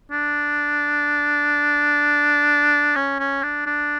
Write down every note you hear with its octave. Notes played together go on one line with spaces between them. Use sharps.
D4
C#4
C#4
D4
D4